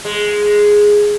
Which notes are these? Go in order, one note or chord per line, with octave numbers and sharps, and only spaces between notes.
G#3